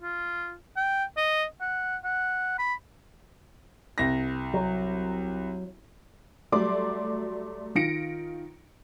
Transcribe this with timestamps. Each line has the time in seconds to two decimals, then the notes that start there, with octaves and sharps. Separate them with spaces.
0.02 F4
0.77 G5
1.17 D#5
1.61 F#5
2.04 F#5
2.59 B5
3.98 C2 A#6
4.54 F#3
6.52 F#3 G3 A3 D5 C6 D6
7.75 D#3 F4 A#6 C#7 D7